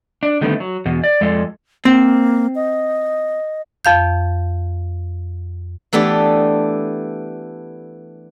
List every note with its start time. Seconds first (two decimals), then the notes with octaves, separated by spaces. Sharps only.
0.23 D4
0.41 D3 D#3 G3 A3 B3 C4
0.60 F#3
0.86 E2 B2
1.04 D5
1.21 F2 G#3 F4 A4 D5
1.85 A#3 C4
2.55 D#5
3.85 F2 F5 G6
5.93 E3 A3 B3 D4 G4